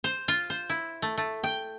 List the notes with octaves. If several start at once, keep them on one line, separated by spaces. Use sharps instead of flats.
C5
F4
C5
E4
A3
A3
G5